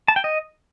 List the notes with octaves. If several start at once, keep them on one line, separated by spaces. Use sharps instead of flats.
A5
G5
D#5